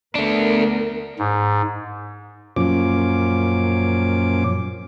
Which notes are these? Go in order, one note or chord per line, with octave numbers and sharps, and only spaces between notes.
A3 B3 D4 A#4
G#2
F#2 A#2 F3 C#4 D6